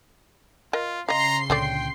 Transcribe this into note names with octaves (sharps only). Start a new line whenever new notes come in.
F4 A#4 D#5
C#3 D#5 F5 A#5 C6 C7
C#2 A#2 D3 A3 C4 D5 G5